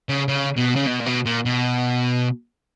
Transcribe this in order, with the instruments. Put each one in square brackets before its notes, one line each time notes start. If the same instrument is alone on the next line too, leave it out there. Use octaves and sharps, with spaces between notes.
[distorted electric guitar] C#3
C#3
B2
C#3
B2
A#2
B2
A#2
B2